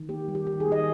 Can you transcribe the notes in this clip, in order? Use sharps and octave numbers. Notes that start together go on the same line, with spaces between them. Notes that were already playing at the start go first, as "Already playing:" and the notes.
Already playing: D#3
A#3 G4
G3
G4
D#3 G4
G#4
A#3
D#5